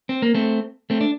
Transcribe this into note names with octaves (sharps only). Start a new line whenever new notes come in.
C4
A#3
A3 C4
A3 C4
D4